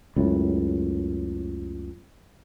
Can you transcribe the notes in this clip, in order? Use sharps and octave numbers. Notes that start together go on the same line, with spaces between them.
C#2 F#2 A2